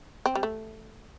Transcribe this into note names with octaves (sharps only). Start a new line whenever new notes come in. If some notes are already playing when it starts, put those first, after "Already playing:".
C4
G3
A3